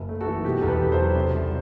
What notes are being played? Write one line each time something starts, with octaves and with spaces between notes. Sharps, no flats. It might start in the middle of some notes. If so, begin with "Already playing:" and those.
Already playing: F#1 F#2
A3
F#4 A4
E3
B2 G4
E2 A4
G4 B4
E2
A4 C5
F#3
C3
C2